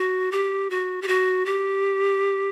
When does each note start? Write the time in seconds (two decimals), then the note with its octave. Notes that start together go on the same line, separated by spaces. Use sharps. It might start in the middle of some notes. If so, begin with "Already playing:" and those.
Already playing: F#4
0.32 G4
0.70 F#4
1.02 G4
1.08 F#4
1.46 G4